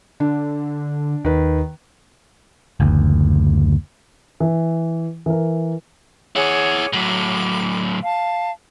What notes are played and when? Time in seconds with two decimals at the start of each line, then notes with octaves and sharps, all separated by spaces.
0.20 D3 D4
1.25 D#2 D#3 B4
2.80 F#1 D2
4.40 E3
5.26 E3 A#4
6.35 E4 G#4 C#5 F#5 D6
6.93 A2 F#3 D6
8.03 F5 A5